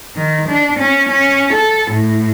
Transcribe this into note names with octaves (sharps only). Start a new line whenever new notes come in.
D#3
D4
C#4
C#4
A4
A2